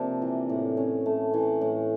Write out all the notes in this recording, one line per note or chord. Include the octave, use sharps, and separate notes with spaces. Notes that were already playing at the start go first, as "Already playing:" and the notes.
Already playing: C3 F3 A#3 D4
E3
A2
C#4
A3
E3
A2